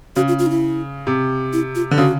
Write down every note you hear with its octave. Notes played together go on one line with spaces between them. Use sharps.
C#3 F#4
F4
F4
D#4
E4
C3
E4
F4
D3
C#3 F#4